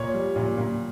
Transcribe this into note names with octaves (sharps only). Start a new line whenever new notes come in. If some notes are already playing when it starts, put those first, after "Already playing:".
Already playing: A#2 C#5
G3
A#2
A#2